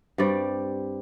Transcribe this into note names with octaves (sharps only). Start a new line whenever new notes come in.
G2 G3 C4 D5